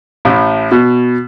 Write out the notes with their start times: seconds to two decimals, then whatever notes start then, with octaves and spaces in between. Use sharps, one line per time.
0.25 A1 A2
0.72 B2